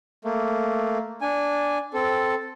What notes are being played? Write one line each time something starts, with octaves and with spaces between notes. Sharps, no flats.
A3 A#3
D4 G#5
C4 A4